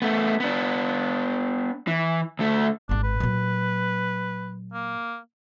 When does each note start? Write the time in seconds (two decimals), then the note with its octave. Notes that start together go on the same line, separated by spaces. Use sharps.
0.02 A3 B3
0.40 B3 D4
1.87 E3
2.39 D2 A3
2.89 G#1 G#2 D4
3.03 B4
3.20 A#2 F#3
4.73 A#3